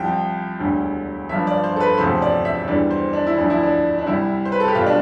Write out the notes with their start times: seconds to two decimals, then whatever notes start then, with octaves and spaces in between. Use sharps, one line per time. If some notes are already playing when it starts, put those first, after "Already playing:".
Already playing: C2 C3 F3 G5
0.60 E1 D2 D3 G3
1.29 G1 G2 F3 E5
1.47 D5
1.64 C5
1.76 A4
1.80 B4
1.98 E1 D2 C3 F3 C5
2.22 D5
2.45 E5
2.68 E2 D3 G3 D5
2.91 C5
3.13 D4
3.27 E4
3.38 D2 D3 F3 D4
3.50 E4
3.63 D4
3.99 D4
4.06 C2 C3 G3 E4
4.45 C5
4.52 B4
4.60 A4
4.68 G4
4.75 B1 B2 G3 F4
4.86 D4